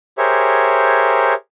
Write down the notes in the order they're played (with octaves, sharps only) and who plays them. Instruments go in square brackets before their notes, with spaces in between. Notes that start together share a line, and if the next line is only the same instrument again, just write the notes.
[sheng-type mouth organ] G4 G#4 A#4 C5 C#5 E5